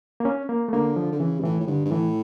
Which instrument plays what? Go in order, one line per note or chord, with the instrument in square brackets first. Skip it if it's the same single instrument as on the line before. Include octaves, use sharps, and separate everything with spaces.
[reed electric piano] A#3
C#4
A#3
A3
[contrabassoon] D3 [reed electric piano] A#3
[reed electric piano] F3
[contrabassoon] D3
[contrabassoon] C#3 [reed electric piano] E3
[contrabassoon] G2
[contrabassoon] A2 [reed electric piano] E3
[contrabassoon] A2
[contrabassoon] G2 [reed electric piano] D3
[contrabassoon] G2
[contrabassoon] A2 [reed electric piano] E3